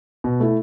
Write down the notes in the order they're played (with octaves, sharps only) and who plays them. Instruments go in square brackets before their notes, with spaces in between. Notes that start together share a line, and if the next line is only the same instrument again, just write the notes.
[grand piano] B2
A3 E4